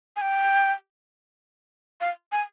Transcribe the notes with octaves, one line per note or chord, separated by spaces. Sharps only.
G#5
G5
F5
G#5